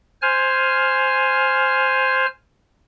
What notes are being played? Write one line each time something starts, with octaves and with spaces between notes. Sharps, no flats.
C5 G#5 F6